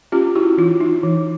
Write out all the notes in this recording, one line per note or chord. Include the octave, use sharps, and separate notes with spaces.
C#4 F4 G4
E4 F#4
E3 D#4 F4
D#4
E3